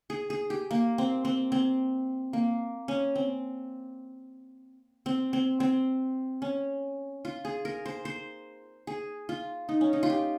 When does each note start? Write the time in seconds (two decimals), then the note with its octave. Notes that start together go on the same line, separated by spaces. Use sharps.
0.10 G#4
0.30 G#4
0.50 G4
0.71 A#3
0.98 C4
1.25 C4
1.52 C4
2.33 A#3
2.88 C#4
3.16 C4
5.06 C4
5.33 C4
5.60 C4
6.42 C#4
7.25 F4
7.45 G#4
7.65 A#4
7.86 C5
8.05 C5
8.87 G#4
9.29 F4
9.69 D#4
9.81 C#4
9.93 D#4
10.03 F4
10.10 G4